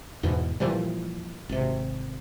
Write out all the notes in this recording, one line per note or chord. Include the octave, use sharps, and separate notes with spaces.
E2 G#2 B2 E3
A#2 E3 F3 G3
G#1 C3